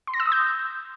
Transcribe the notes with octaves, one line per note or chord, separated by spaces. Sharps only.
C6
A#6
E6
D#6
G6